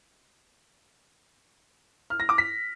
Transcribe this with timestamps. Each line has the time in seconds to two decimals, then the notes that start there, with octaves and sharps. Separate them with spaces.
2.10 F6
2.20 A#6
2.29 D6
2.38 B6